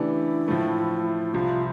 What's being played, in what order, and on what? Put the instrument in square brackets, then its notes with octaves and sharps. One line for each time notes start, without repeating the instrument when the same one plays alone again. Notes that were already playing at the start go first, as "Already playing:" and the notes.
Already playing: [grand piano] C#3 E3 A3 D4 G4 [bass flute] E4
[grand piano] A2 F3 A3
[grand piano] C2 C3 F3 [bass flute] F4